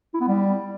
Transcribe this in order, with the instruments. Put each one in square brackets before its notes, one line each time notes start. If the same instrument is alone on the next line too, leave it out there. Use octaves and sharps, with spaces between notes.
[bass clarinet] E4
B3
G3